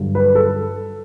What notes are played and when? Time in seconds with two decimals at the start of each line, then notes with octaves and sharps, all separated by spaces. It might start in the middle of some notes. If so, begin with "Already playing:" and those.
Already playing: G2 D3 F#3
0.15 B4
0.35 A4